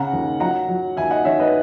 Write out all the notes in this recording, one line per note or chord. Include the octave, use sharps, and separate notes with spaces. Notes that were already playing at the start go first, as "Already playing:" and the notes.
Already playing: C#3 F#5 A#5
D#2
F#3 F#5 A#5
F#3
D#2 E5 G#5
D#5 F#5
D#3 C#5 E5
B4 D#5